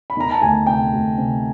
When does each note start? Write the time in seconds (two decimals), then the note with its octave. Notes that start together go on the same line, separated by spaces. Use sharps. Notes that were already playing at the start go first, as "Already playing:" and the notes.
0.10 B5
0.17 D#3 A#5
0.31 A5
0.41 D2 G#5
0.66 C3 G5
0.92 D2
1.18 C3